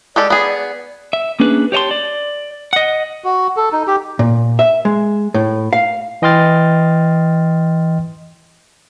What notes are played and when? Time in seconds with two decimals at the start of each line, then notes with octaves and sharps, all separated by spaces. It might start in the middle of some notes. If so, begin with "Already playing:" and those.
0.16 G#3 G4 A4 D5
0.30 B3 G#4
1.13 E5
1.40 A#3 C#4 D4 G#4 B4
1.72 G4 C#5 D#5 A5 C6
1.91 D5
2.73 D#5 F#5
3.24 F#4
3.57 A4
3.73 D#4
3.87 G4
4.19 A#2
4.59 E5
4.85 G#3
5.34 A2
5.73 F5
6.22 E3 D#5 G5 C6 F6 A6